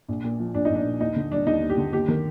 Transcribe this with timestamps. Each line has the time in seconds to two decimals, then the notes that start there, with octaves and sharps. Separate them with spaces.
0.08 A#1
0.24 A#2
0.40 F3
0.54 A#1 D4
0.65 A#1 D#4
0.75 D4
0.85 A#2
1.01 D#2 D#4
1.16 D3
1.31 G3 D4
1.47 D#2 D#4
1.62 D#2
1.70 G4
1.78 D3
1.93 D#2 G4
2.08 D#3